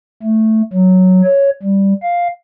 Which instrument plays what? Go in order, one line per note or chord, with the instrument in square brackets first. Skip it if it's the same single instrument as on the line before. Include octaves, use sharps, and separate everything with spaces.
[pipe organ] A3
F#3
C#5
G3
F5